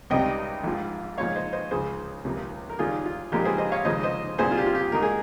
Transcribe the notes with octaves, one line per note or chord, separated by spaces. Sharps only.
C#2 C3 G3 C4 D#4 D#5 G5
A#1 G#2 F3
A#2 F3 G#3 D#4 C#5 F5
C5 D#5
C5 D#5
C#2 C#3 F3 G#4 C5
C#2 C3 F3 A#3
A#4
D#2 D#3 G3 F4 G#4
F4
A#1 A#2 G#3 D#4 G4 A#4
G#4 C5
C5 D#5
C#5 F5
D#2 C#3 F3 G#3 D#4 C5 D#5
C5 D#5
C2 A#2 G3 G#4 C5
F4
G4
F4
G4
G#2 D#3 A#3 D#4 A#4
G#4